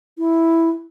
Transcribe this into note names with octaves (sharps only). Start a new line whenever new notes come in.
E4